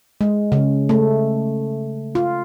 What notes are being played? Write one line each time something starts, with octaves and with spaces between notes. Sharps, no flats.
G#3
C#3
A3
F4